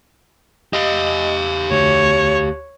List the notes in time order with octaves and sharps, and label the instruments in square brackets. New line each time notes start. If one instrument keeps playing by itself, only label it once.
[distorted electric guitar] G4 F5 [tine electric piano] D#5
[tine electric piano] D2 [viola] C#5